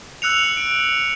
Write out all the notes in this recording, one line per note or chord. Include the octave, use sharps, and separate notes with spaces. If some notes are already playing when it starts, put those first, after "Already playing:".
E6 F#6 C#7 F7
D7